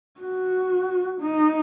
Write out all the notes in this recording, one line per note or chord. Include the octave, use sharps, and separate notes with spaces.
F#4
D#4